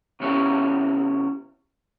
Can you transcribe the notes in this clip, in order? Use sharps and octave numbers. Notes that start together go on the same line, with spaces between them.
C3 F#3 B3 C#4 E4 G4